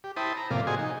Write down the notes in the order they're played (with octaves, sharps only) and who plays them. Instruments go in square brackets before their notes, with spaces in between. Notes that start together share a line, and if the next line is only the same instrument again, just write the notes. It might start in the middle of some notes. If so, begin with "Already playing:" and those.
[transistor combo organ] G4
E4 C5 G5 A5 B5 D#6
A#5
A2 C3 F3 A#3 D5 F5
F#4 G#4 C5 D#5 G#5
D#4